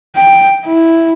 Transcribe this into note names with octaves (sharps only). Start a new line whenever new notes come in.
G5
E4